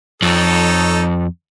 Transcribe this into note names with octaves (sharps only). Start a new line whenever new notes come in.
F2 D#4 A4 C#5